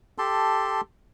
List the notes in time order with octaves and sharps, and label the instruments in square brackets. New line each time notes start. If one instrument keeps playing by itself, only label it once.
[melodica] G4 A4 A5 C6